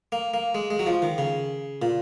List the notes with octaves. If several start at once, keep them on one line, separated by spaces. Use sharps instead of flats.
A#3
A#3
G#3
G#3
F#3
F3
D#3
C#3
A#2